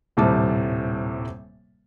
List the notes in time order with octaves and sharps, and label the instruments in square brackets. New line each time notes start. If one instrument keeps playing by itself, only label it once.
[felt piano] D#1 A2 C3 G3 A5